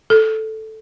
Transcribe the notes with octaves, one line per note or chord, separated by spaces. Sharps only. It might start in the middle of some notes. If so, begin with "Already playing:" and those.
A4